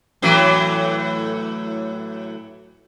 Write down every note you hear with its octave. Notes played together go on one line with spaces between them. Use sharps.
A2 E3 F#3